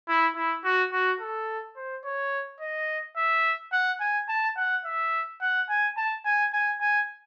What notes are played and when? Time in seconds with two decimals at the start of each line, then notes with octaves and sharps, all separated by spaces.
0.08 E4
0.36 E4
0.64 F#4
0.92 F#4
1.20 A4
1.76 C5
2.05 C#5
2.60 D#5
3.17 E5
3.72 F#5
4.00 G#5
4.29 A5
4.57 F#5
4.85 E5
5.41 F#5
5.69 G#5
5.97 A5
6.25 G#5
6.53 G#5
6.81 G#5